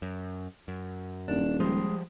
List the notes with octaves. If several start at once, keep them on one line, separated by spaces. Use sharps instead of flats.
F#2
F#2
D#1 D4
F3 G3 G#3